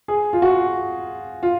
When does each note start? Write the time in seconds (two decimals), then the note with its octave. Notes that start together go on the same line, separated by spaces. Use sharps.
0.08 G#4
0.33 F4
0.42 F#4
1.43 F4